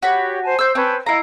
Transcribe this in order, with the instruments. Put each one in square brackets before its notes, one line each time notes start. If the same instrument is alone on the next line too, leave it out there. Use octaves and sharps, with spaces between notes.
[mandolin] F#4 B5 [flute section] G4 C#5
[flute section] C5 G#5 A5
[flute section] C5 [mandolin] E6 G6
[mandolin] C4 [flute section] C#4 B4 A5
[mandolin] E4 A#5 [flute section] D#5 F5